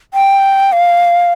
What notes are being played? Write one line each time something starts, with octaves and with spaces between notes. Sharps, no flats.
G5
F5